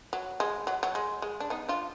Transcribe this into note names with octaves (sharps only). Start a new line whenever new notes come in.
F#3
G#3
F#3
F#3
G#3
G#3
D4
B3 D#4
D4 F4